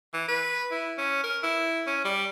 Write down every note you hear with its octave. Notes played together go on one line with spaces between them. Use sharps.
E3
B4
E4
C#4
A#4
E4
C#4
G3